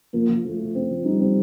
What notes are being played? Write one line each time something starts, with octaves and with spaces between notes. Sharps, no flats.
F3 A#3
F3
F3 A3
F3
C4
F3
G3 D#4
C4